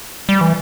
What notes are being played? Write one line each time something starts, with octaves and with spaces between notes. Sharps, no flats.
G3
E3